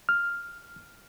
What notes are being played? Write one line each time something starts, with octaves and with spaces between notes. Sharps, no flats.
F6